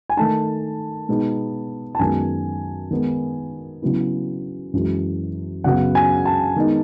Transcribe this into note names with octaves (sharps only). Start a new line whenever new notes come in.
G#5
D#3 A3 D#4 A5
B2 G#3 B3 D#4
A5
F#2 D#3 G#3 B3 G#5
D#3 G#3 B3 D#4
C#3 F#3 B3 E4
F#2 E3 G#3
F#2 C#3 F#3 B3 F#5
G#5
A5
D#3 G#3 B3 D#4